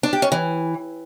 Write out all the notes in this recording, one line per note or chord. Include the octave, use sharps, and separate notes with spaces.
D4
G4
C#4
E3